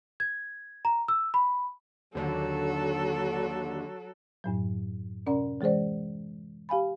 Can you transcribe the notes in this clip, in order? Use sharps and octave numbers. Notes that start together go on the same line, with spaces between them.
G#6
A#5
E6
B5
D#2 D3 F#3 A4
F#2 A2 F#3
C3 C#4 A#4 D5 F#5 A#5
E3 G#3 G#4 C5 D5
G4 F5 G#5 B5